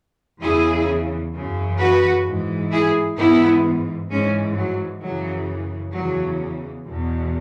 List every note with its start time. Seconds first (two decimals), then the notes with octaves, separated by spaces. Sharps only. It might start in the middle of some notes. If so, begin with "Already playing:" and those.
0.41 E2 C#3 E3 E4 G#4
1.33 F#2 C#3 E3
1.79 F#4 B4
2.25 G#2 E3
2.71 E4 G#4
3.17 G#2 E3 B3 E4
4.10 G#2 E3 G#3 C#4
4.57 F#3
5.02 F#2 C#3 E3 F#3
5.94 E2 C#3 E3 F#3
6.86 E2 B2